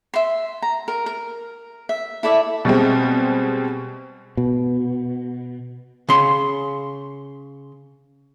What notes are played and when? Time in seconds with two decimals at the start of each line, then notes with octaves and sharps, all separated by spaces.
0.14 E5 C6
0.62 A#5
0.88 A#4
1.06 A#4
1.89 E5
2.23 E4 A4 D5 E5
2.65 B2 G3 G#3 C4
4.37 B2
6.09 C#3 C6